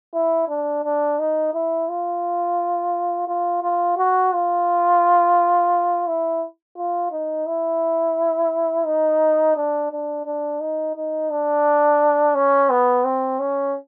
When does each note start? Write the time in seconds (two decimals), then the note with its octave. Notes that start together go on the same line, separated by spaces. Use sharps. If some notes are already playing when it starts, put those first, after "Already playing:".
0.14 E4
0.49 D4
0.84 D4
1.19 D#4
1.53 E4
1.89 F4
3.28 F4
3.62 F4
3.97 F#4
4.33 F4
6.07 E4
6.77 F4
7.11 D#4
7.46 E4
8.86 D#4
9.56 D4
9.92 D4
10.26 D4
10.60 D#4
10.96 D#4
11.30 D4
12.35 C#4
12.70 B3
13.04 C4
13.40 C#4